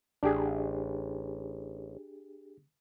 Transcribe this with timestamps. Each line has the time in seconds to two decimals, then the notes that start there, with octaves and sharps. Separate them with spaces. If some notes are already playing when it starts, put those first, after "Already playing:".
0.23 A1 D4 G4 G#4